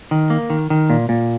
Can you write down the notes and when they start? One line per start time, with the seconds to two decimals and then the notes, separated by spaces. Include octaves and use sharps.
0.11 D#3
0.30 A#3
0.50 D#3
0.70 D#3
0.90 A#2
1.09 A#2